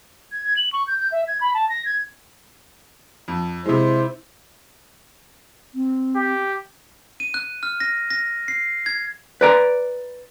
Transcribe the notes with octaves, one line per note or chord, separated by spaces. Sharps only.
G#6
G#6
F#7
C#6
G6
G6
E5
G#6
B5
A5
A#6
G#6
F2
C3 G#3 E4 C5
C4
G4
D#7
F#6
F6
A#6
A#6
C7
G#6
B4 D5 A#5